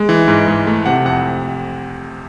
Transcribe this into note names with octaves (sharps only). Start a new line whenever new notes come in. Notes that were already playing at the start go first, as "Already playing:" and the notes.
Already playing: G#3
E3
G#2
G#2
A3
C3 F#5
F2 F#5